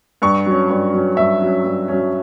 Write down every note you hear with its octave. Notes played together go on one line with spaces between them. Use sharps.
G2 C#6
F#3 C#4
G2
F#3 C#4
G2 E5
F#3 C#4
G2
F#3 C#4